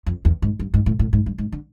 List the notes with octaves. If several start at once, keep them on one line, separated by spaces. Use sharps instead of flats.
F2
E2
G#2
G2
G#2
A2
A2
G#2
G2
G#2
D3